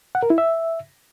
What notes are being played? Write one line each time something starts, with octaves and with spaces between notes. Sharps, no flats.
F#5
A#4
E4
E5